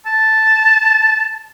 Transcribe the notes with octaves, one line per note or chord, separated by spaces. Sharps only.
A5